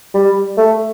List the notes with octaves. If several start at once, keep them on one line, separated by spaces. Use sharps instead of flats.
G3
A3